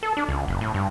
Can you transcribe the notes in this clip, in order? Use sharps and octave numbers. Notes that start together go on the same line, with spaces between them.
A4
D4
C#2
F#1
A2
G2